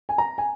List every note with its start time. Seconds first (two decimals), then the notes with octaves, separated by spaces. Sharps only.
0.09 G#5
0.18 A#5
0.38 G#5